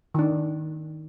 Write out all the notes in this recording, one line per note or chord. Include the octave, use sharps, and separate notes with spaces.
D#3 D4